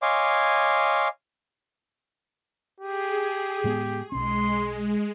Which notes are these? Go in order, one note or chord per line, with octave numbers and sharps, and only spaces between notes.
C#5 D#5 F5 G#5 C6 D6
G4 G#4
A2 G#3 B3
B1 G#3 C#4 C6